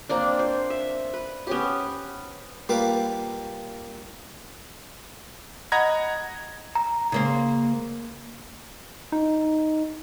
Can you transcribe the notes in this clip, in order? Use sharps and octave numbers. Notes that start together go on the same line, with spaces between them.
A#3 C4 D4
C5
E5
B4
B3 C#4 G4
G3 A#3 F4 G4 B4 D6
D#5 F#5 A#5 B5 G#6 A#6
A#5
C#3 A#3 C5
D#4